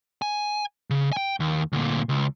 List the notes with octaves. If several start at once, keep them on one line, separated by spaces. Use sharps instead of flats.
G#5
C#3
G5 G#5
D#2
D2 A#2
C#2